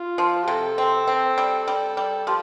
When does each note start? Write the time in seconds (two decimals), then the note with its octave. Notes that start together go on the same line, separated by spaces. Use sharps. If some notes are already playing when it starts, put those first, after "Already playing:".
Already playing: F4
0.18 F3
0.47 C3 A4
0.78 C4
1.07 C4
1.38 G3
1.68 G3
1.97 G3
2.27 F3 G4